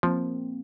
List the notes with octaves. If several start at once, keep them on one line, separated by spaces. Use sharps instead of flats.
F3 A#3 C4